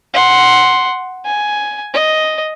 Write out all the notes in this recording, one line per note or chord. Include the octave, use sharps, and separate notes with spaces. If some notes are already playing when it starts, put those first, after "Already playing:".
F#5 C6
G#5
D#5